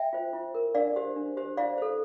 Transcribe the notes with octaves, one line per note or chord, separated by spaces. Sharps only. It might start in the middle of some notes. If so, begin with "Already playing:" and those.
Already playing: E5 G5
F4 C5
E4
A#4
D4 D5 F5
G4 C5
D4
G4 C5
E4 D5 F5
A4 C5